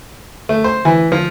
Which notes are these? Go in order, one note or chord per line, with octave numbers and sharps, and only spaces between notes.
A3
C5
E3
F3